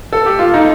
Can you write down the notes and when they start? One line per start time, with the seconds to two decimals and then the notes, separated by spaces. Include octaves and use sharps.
0.13 A4
0.26 G4
0.39 F4
0.54 D#4